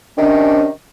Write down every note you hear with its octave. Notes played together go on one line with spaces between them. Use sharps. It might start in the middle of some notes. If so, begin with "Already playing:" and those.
C3 D#3 C#4 D4